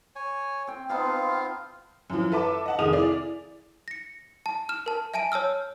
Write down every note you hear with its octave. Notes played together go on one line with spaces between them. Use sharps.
C#5 G#5
C4 G5
B3 C4 D#4 F4 F5 A5
F#2 E3 F3
A4 B4 E5 A5 D6
D#5 F#5 A5
F1 D#3 G#4 D#6 F7
E4 G#4 D5
A#6 C#7
A5
F6 E7
A#4 A5
E5 G#5 A5 D7 D#7
C#5 A5 E6 F6